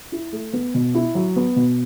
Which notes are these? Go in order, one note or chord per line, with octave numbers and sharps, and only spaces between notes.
E4
A3
B3
B2
E4
F#3
B3
B2